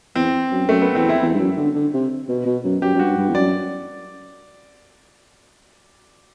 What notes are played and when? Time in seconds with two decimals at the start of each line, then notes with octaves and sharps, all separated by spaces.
0.15 E2 C4
0.52 F#2
0.68 F#2 A3
0.82 B3
0.95 E2 C4
1.09 E4
1.22 E2
1.34 G2
1.40 F#2
1.57 D3
1.75 D3
1.94 C3
2.29 B2
2.46 B2
2.64 F#2
2.82 F#2 G4
2.95 F#2
2.99 G2 F#4
3.17 G2
3.29 E2
3.35 F#2 D5